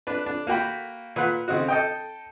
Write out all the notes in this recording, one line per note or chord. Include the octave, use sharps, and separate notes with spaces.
D4 B4
D4
A#3 F#4 G5 B5
A#2 B4 F#5
C#3 C4 D#4 F#4
A4 D#5 G5